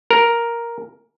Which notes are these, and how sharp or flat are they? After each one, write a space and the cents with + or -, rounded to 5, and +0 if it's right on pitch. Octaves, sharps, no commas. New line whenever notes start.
A#4 +5